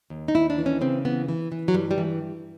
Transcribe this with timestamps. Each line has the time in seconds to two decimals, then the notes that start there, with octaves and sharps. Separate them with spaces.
0.10 D#2
0.28 D#4
0.34 D#2 E4
0.50 D4
0.58 E3
0.66 C#4
0.81 C#3 C4
1.05 E3 B3
1.29 E3
1.52 E3
1.68 F#3
1.74 G2 G3
1.91 G3
1.98 E3